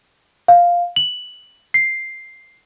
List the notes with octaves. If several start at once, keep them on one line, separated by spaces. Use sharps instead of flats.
F5
F#7
C7